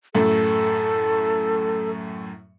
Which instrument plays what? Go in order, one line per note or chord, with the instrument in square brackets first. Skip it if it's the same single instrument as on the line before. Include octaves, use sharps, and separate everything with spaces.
[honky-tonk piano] F#2 A2 A3 [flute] A4